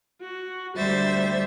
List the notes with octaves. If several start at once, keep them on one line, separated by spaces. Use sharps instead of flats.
F#4
D2 G3 C5 E5 A6